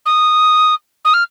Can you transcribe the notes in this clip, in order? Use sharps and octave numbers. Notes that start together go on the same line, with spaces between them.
D#6
D#6
F6